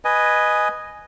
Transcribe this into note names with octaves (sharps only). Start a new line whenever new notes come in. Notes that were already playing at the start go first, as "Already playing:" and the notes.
B4 D#5 G#5